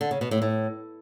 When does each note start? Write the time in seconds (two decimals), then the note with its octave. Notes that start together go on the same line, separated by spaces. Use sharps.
0.01 D3
0.11 C#3
0.21 B2
0.31 A2
0.42 A2